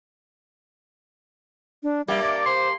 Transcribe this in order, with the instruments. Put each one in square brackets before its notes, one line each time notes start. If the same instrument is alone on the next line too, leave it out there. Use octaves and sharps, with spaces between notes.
[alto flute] D4
[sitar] G2 A#3 G4 [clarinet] G3 [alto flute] E5
[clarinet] D5
[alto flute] C5 [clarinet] C6